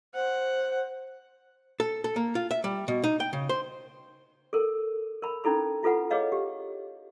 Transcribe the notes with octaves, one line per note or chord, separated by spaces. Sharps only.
C5 F#5
A4
A4
A#3
F4
E5
G3
B2
D#4
G5
C#3
C5
A4 A#4
A#4 B5
C#4 D#4 E4 A4 B5
E4 F4 A4 B4 F#5
G#4 B4 C#5 D#5 F5
G4